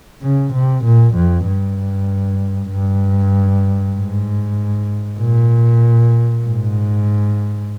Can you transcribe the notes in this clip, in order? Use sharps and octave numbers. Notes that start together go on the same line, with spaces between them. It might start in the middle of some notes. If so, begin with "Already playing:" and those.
C#3
C3
A#2
F2
G2
G2
G#2
A#2
G#2